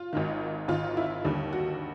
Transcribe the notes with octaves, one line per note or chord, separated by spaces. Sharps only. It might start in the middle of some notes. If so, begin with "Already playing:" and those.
Already playing: F4
G#1 G#2 D#3
G#1 G#2 D#3 F4
E4
D#2 D3 G3
F#4